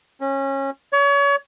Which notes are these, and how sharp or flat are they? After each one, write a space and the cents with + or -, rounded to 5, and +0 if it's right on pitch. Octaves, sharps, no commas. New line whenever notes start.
C#4 -25
C#5 +35